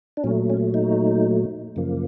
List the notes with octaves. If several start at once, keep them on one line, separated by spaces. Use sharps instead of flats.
D4
A#2 F#3 A3 C#4
C#4
D#4
F#2 C#3 F3 A#3